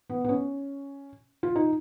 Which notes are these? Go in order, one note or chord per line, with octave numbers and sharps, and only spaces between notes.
B3
B3
C#4
F4
D#4